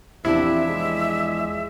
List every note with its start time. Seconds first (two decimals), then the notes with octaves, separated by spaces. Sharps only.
0.25 E2 C3 F3 D4 E4 E5
0.68 G#3